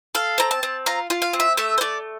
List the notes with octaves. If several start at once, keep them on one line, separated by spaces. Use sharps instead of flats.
A4 F5
C4 A#5
A5
C4
F4 A#5
F4
F5
C4
E5
A3 E5
C5
A3 D5